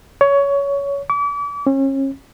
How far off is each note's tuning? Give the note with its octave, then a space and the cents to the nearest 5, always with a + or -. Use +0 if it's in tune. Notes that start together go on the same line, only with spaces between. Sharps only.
C#5 +20
D6 -40
C#4 -35